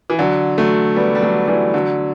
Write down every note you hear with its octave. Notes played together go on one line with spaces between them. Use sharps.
E3
D3 F#3
F#3 A3
G3 B3
G3
F#3 A3
E3 G3
D3 F#3